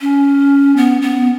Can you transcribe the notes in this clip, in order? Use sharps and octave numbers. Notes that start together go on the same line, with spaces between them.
C#4
B3
B3